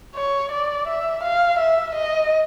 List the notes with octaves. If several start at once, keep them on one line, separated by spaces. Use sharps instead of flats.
C#5
D5
E5
F5
E5
D#5